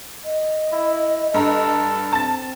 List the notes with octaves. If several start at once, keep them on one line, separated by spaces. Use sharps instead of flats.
D#5
E4
G2 A4 A#5
C4 A5 A6